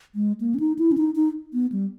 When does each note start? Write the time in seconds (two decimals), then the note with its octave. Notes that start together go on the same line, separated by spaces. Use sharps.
0.15 G#3
0.41 A#3
0.55 C#4
0.60 D#4
0.79 E4
0.92 C#4
0.98 D#4
1.15 D#4
1.53 B3
1.72 G3